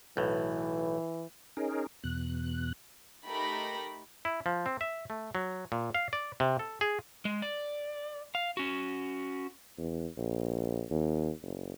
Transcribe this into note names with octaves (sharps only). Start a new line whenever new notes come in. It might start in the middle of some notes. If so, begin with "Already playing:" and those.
B1 A2 E3
C#4 D#4 G#4 A#4
E2 B2 F#6
A3 D#4 G4 A#4 B5 A#6
E4
F3
C4
E5
A3
F#3
A#2
F5
D5
C3
A4
G#4
G#3
D5
F5
C#4 F#4
E2
A#1
D#2
F#1